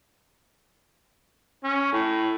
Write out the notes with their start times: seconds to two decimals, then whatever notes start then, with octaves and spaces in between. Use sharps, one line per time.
1.64 C#4
1.92 A2